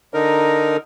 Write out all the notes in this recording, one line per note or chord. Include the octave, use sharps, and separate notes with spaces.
D3 D#4 A#4